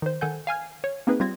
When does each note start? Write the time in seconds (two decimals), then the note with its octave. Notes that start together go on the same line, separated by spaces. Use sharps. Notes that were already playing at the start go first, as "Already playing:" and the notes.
0.02 D#3 C5
0.21 D#3 A4 F#5 G#5 G6
0.47 F5 G#5 F6 G#6
0.84 C#5
1.07 A#3 C4 D#4 G#4 B4
1.20 G3 C4 F4 G#6 A#6